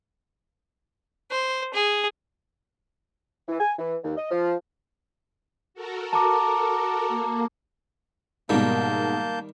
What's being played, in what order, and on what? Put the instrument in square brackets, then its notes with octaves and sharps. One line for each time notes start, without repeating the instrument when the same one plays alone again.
[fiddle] C5
G#4
[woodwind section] E3
G#5
E3
D#2
D#5
F3
[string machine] F#4 A4 A#4
[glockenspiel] A5 A#5 D6
[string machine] A#3
[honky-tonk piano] G#2 B2 [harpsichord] D#3 G3 [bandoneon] A#3 A5 G6